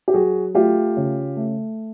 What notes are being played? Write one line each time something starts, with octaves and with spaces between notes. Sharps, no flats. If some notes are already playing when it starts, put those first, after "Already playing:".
G4
F#3 F#4 G#4
A3 F4 G4
C#3
A3